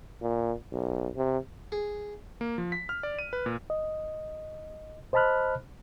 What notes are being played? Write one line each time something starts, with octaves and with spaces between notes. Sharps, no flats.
A#2
B1
C3
G#4
A#3
F3
B6
F6
D5
D#7
B4
A#2
D#5
C5 D#5 A5 B5 F6 F#6